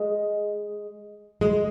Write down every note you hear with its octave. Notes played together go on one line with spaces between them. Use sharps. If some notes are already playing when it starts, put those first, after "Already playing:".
Already playing: G#3
G#3